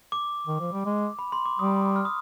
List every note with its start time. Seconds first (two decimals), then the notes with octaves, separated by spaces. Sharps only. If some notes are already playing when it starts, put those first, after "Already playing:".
0.12 D6
0.47 D#3
0.60 F3
0.73 G3
0.86 G#3
1.19 B5
1.32 C6
1.45 D6
1.59 G3 D#6
1.96 F6
2.05 D#6